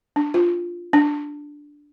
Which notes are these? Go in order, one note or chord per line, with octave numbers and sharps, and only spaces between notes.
D4
F4
D4